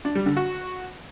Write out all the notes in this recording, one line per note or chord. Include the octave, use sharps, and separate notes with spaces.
D4
G3
D3
F#4